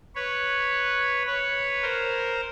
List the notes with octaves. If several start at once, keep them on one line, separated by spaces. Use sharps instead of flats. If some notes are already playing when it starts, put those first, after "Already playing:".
B4 C#5
B4 C#5
A#4 C5